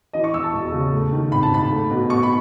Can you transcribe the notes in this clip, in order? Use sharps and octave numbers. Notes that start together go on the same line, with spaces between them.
E3 D#5
C#6
E2 E6
A5
E1
C#3
A3
D#3
G#1 B5
A5
G#2 B5
A3
B2
B2 C#6
B5